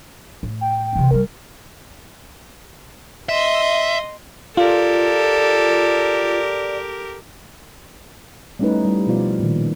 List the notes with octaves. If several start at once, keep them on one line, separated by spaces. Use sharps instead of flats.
A2
G5
C3 E3
G3 A#3 A#4
D#5 E5 C6
F4 G4 A4 A#4 D5
G3 A3 C#4 D#4 E4 B4
G3 E4
B2 F3 B3 F4 C5 D5
A#2 D#3